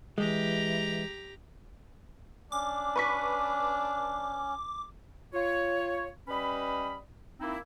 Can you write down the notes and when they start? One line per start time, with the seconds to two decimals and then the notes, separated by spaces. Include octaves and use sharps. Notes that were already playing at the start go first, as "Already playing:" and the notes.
0.18 E3 G#3 G4 A#5
2.52 C#4 D4 D6
2.96 B4 C#6 B6
5.34 F4 C#5
6.28 G3 C#4 B4 D#5 B5
7.40 A#3 C4 D#4 E4